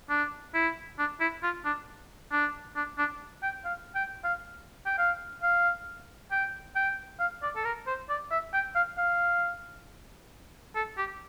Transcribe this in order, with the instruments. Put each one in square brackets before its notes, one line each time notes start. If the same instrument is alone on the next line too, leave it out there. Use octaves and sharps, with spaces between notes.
[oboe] D4
E4
D4
E4
F4
D4
D4
D4
D4
G5
F5
G5
F5
G5
F5
F5
G5
G5
F5
D5
A4
A#4
C5
D5
E5
G5
F5
F5
A4
G4